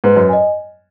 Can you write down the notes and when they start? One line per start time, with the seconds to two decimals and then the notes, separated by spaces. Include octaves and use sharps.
0.04 G#2 B4
0.16 F#2
0.29 D#5 G#5